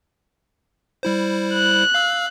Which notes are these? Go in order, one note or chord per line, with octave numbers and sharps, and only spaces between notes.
G3 E4 C5
F#6
F5 E6